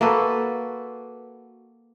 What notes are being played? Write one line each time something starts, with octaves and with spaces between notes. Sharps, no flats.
A#3 F#4 A4 B4